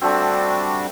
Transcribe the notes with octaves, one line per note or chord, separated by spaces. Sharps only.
G3 A3 C4 D4 F#4